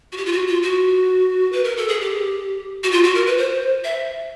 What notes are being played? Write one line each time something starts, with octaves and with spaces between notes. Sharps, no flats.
F#4
G4
F4
F#4
F4
F#4
B4
A#4
A4
G#4
G4
F#4
F4
F#4
A#4
B4
C5
E5